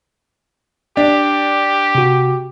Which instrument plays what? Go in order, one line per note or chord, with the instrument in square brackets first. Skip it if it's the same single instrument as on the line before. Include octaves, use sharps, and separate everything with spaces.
[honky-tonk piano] D4 [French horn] G4
[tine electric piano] C3 F#4